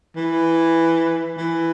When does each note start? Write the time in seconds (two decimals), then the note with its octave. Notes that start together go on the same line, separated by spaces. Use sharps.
0.17 E3
1.38 E3